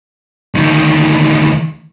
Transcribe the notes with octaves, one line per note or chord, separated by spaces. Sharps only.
D2 D#3